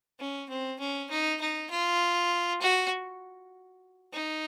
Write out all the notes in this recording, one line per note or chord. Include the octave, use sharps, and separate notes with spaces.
C#4
C4
C#4
D#4
D#4
F4
F#4
D#4